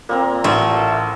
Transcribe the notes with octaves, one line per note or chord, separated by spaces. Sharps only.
A#2 A#3 C4 A#5
A1 A3